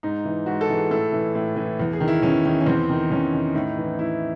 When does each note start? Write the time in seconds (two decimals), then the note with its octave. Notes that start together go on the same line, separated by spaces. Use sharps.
0.03 G#2 D#4
0.25 E3
0.46 G#2 F#4
0.61 A4
0.69 E3
0.76 G#4
0.91 A2 A4
1.12 E3
1.35 A2
1.56 E3
1.79 E2
1.93 G#4
2.00 D#3
2.08 E4
2.22 E2 C#4
2.45 D#3
2.61 C#4
2.66 E2 C4
2.90 D#3
3.10 E2 C#4
3.33 D#3
3.55 A2 D#4
3.78 E3
3.99 A2 E4